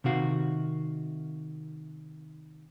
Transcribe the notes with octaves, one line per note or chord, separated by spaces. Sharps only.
C3 D#3 F#4 F5